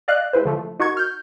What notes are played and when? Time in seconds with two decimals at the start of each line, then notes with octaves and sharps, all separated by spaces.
0.08 D5 D#5 F5 F#6
0.33 G#3 E4 B4 C5
0.45 D3 F3 A3
0.80 D#4 F#4 A#4 C#6 G#6
0.97 F6 G6